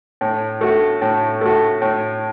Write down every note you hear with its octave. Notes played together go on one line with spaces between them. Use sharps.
A2
A3 F#4
A2
A3 F#4
A2